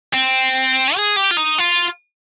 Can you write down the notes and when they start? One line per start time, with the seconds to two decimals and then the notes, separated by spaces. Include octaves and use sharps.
0.14 C4
0.96 G#4
1.17 G4
1.31 F4
1.37 D#4
1.59 F4